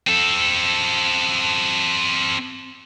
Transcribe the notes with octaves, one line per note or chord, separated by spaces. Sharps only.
C4 A4